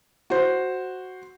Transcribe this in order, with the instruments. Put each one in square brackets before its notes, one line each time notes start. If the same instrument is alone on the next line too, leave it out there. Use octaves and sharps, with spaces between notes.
[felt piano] F#4 C5